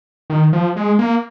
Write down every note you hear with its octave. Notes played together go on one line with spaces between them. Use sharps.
D#3
F3
G#3
A#3